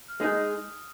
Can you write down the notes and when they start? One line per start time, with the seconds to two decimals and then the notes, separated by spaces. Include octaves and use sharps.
0.08 F6
0.20 G#3 D#4 G#4 D#6